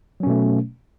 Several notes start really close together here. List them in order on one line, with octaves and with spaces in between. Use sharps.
F#3 C#4 B2 A3